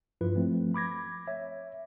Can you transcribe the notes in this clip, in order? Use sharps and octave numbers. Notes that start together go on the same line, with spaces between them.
G2 F3 E4 F4 B4
F3 A3 C4
B5 D6 G#6 A#6
C#5 E5